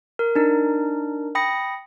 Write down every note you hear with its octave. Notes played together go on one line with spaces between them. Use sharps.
A#4
D4 D#4 A#4
G5 B5 D#6 A#6 C#7